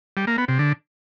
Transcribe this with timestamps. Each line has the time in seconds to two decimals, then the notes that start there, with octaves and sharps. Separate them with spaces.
0.17 G3
0.27 A#3
0.38 B3
0.48 C3
0.59 D3